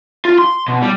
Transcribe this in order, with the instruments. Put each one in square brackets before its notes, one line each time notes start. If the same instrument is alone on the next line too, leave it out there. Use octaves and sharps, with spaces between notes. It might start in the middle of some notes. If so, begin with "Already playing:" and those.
[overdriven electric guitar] F4
C6
B2
G3